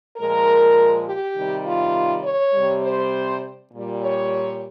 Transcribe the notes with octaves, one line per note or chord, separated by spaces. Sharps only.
A#2 F3 G#3 A#4
G4
C3 D#3 G3
F4
C#5
C3 G3
C5
A#2 G3
C#5